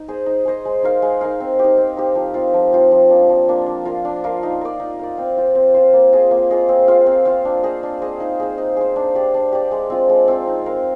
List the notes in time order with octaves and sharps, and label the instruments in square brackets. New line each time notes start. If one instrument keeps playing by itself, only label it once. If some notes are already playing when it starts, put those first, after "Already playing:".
Already playing: [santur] D#4
G#4 C5 D#5
D#4
G#4 C5 D#5
G#3
D#4 A#4 F5
G#3
D#4 A#4 F5
C4
D#4 G4
C4
D#4 G4
F3
C4 F4
F3
C4 F4
F3
A#3 D4
F3
A#3 D4
D4
F4 A#4 F5
D4
F4 A#4 F5
D#4
A#4 D5
D#4
A#4 D5
C4
F4 C5
C4
F4 C5
A#3
F4 G#4 D#5
A#3
F4 G#4 D#5
C4
F4 C5 F5
C4
F4 C5 F5
D4
G#4 C5 D#5
D4
G#4 C5 D#5
D#4
G#4 C5
D#4
G#4 C5
D4
G4 D5
D4
G4 D5
G#3
C4 F4
G#3
C4 F4
D#4
A#4 F5